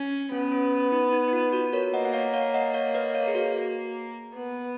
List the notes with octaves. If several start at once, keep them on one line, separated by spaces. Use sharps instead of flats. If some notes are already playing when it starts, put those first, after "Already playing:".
Already playing: C#4
B3 C#4
C#4
D#4
D#4
D#4
F4
F#4
A#4 C#5
A#3 D#5 F#5
F#5
C#5 F5
C#5 F5
D#5 F#5
C#5 F5
B4 D#5
C#5 F5
G#4
F#4
B3